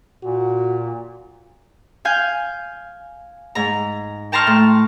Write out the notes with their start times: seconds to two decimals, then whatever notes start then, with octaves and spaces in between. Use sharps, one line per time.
0.23 A#2 F#4
2.05 F5 G#5 G6
3.55 G#2 A#5
4.32 G5 A5 A#5 C6 C#6 F6
4.47 A2